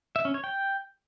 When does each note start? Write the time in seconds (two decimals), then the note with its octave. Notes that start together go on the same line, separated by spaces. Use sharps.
0.16 E5
0.25 C#4
0.34 C#5
0.44 G5